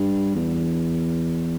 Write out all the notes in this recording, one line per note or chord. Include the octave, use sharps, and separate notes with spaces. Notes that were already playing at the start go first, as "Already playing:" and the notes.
Already playing: G2
E2